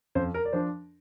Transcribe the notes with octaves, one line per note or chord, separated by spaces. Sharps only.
F2 C5
A#4
D5
F3 D4 C5